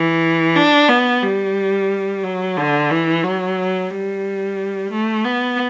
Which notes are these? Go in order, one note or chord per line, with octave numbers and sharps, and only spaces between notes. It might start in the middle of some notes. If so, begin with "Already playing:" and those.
Already playing: E3
D4
B3
G3
F#3
D3
E3
F#3
G3
A3
B3